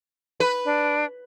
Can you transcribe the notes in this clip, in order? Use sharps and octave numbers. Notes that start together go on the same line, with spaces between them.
B4
D4